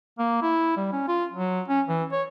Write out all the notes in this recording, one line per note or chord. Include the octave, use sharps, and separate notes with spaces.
A#3
E4
G3
C#4
F4
F#3
C#4
E3
C#5